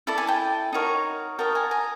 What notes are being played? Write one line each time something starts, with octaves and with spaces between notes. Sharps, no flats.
E4 A4 D5 A5
G#5
G5 A5
D#4 F#4 A#4 C#5
F#4 A#4 D#5 G5 A5
G#5 A#5
G#5 A#5